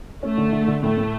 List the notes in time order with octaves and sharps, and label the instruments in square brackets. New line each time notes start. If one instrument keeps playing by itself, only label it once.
[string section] A3 [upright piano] C#4
[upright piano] D3
D3
D3
[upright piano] A2 [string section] A3
[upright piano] A2